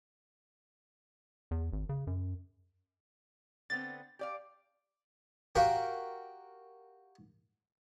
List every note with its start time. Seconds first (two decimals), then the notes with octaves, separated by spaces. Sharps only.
1.51 E2
1.73 G#1
1.89 C#3
2.07 F#2
3.70 D3 B3 C4 A6
4.19 G4 D5 F5
5.55 F#4 G4 A#4 F5 G5